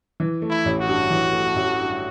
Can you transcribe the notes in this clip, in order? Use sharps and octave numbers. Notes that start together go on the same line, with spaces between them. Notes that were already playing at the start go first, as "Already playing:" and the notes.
E3
A3
E4
A1
F#4
G2
E3
A3
A1
G2